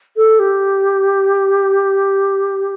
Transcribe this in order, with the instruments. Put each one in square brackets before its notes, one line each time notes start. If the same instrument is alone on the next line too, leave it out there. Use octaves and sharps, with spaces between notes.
[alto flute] A4
G4